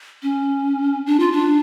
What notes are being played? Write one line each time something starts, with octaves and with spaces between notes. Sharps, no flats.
C#4
D4
F4
D4